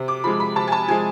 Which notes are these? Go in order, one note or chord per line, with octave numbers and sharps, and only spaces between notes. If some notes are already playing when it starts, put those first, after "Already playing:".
Already playing: C3
D6
F3 G#3 B5
B5
C3 A5
G#5
A5
F3 G#3 G#5